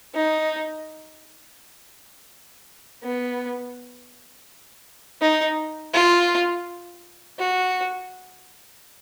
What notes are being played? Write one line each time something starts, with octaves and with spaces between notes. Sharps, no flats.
D#4
B3
D#4
F4
F#4